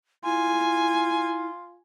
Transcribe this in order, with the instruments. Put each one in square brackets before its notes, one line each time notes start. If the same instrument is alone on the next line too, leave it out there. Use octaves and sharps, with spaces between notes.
[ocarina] E4 [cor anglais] F4 [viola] G#5